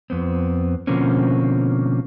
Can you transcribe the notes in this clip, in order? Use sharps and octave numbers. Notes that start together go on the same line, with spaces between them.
F2 B3 C4
B2 D3 F3 A#3 C4 C#4